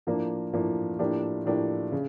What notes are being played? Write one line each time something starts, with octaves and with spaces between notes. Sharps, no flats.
A2 F3 A#3 D4
A2 F3 A#3 D4
A2 F3 A#3 D4 G4
A2 F3 A#3 D4 G4
C#3